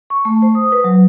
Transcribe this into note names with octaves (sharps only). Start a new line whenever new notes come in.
C#6
A3
C5
D#6
B4
F#3